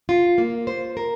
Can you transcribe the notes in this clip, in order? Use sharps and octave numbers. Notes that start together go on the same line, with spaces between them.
F4
A#3
C5
A#4